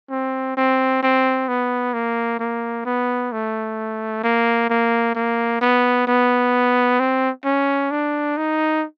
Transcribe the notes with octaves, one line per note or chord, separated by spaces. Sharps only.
C4
C4
C4
B3
A#3
A#3
B3
A3
A#3
A#3
A#3
B3
B3
C4
C#4
D4
D#4